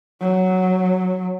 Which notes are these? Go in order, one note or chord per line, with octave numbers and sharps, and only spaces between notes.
F#3